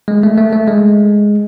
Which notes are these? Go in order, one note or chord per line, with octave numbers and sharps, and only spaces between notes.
G#3
A3
A3
A3
G#3